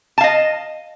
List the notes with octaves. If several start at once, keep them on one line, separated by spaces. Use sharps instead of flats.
D#5 F5 A5